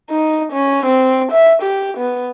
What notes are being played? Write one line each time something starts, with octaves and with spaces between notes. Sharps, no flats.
D#4
C#4
C4
E5
G4
B3